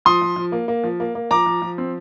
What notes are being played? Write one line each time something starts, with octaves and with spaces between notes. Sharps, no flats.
F3 C6 D#6
F3
F3
A#3
A#3
F3
A#3
A#3
F3 A#5 D6
F3
F3
C4